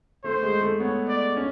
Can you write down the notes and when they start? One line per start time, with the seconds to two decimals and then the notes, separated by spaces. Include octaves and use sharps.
0.24 A3 C5
0.42 G#3
0.61 A3
0.79 B3 C#5
1.08 D5
1.36 C#4